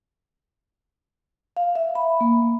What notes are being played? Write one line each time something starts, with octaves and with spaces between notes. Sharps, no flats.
F5
E5
B5
A#3